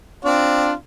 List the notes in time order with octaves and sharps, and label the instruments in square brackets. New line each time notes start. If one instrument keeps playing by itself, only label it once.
[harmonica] C4 D4 D5 [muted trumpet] F4